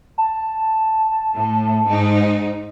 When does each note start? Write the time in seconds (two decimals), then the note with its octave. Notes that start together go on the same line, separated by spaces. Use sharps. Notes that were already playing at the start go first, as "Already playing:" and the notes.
0.18 A5
1.36 A2
1.87 G#2 D#4